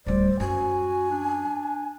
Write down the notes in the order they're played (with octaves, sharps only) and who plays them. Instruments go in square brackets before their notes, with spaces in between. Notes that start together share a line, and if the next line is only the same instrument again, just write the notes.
[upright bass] D1 G3 [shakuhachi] C5 [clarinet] D5
[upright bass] F#2 [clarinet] F#4 [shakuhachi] G#5
[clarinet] D4